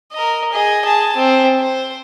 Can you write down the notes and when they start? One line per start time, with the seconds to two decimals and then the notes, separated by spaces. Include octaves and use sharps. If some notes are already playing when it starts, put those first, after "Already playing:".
0.13 A#4 D#5
0.52 G#4 D#5
0.85 G#4 A5
1.16 C4
1.59 C5